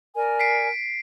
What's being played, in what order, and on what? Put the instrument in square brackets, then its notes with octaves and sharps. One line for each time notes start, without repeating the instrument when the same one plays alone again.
[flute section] A#4 D5 G#5
[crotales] B6 C7 D7